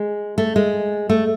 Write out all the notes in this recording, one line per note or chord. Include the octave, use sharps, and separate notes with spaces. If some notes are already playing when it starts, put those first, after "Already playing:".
Already playing: G#3
A3
G#3
A3